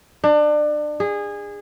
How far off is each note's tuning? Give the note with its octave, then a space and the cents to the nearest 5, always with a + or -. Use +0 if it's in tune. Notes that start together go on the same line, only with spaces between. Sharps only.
D4 +30
G#4 -20